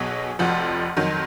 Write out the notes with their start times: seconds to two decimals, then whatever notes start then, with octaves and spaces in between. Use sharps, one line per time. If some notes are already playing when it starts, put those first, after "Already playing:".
Already playing: B1 B2 F#3 G#4
0.39 F1 F2 F3 F#4
0.97 F2 D#3 F#3